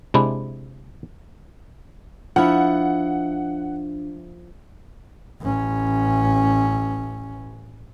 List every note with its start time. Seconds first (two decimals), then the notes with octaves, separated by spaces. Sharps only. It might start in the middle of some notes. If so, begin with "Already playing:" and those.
0.14 C3 G#3 D4 E4
2.36 F3 D4 E4 F#5
5.41 A1 C#4